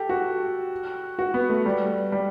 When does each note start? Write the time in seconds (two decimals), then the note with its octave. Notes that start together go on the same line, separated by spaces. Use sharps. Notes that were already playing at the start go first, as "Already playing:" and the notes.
Already playing: G4 A4
0.09 F#4
1.19 F#4
1.34 B3
1.50 A3
1.66 G3
2.12 G3